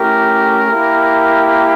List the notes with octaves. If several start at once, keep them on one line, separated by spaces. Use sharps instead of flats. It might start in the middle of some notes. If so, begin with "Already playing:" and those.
Already playing: A3 C#4 E4 G4 A#4
A#3 E4 G4